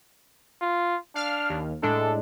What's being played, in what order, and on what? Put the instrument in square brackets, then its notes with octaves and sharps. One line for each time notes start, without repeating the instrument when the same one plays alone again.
[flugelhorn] F4
[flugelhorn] D4 [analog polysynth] F5 F6
[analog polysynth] D#2
[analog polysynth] A2 G#3 D4 [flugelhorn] A4